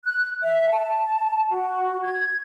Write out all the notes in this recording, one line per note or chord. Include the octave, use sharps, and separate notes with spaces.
F#6
E5
A5
F#4
G#6